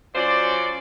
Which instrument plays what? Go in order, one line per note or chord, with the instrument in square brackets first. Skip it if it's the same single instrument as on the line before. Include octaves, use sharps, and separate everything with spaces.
[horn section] F#3 C#4 F4 C5 D5